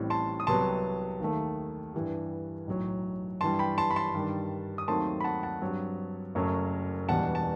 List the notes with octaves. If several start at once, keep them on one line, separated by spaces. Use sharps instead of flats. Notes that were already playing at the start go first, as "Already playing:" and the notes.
Already playing: A1 A2 G3 C4
A5 C6
D#6
C2 C3 F#3 B3 A5 C6
D#2 D#3 A3
G2 E3 G3
B1 A2 F#3
G2 E3 G3 A5 C6
G5 B5
A5 C6
B5
A5 C6
G2 D#3 G3
D#6
D#2 D#3 F#3 A3 C4 A5 C6
B5
F#5 A5
F#5 A5
G2 F#3 C4
F#1 F#2 F#3 A3
E1 E2 B2 G3 B3 F#5 A5
A5